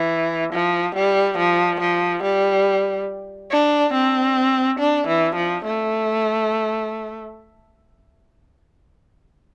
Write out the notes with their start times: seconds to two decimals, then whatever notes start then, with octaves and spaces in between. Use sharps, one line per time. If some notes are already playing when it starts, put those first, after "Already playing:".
Already playing: E3
0.53 F3
0.95 G3
1.38 F3
1.80 F3
2.23 G3
3.51 D4
3.94 C4
4.79 D4
5.07 E3
5.36 F3
5.64 A3